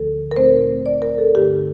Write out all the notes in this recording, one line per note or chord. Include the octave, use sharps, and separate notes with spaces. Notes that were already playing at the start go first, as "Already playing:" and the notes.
Already playing: D2 D3 F3 A3 A4
A#4
A#2 A3 C4 D#4 C5
D5
A#4
A4
G2 D3 A3 D#4 G4